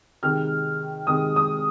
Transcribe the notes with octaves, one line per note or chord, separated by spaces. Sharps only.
C3 D#3 G#3 F6
C3 D#3 G#3 D#6
D#6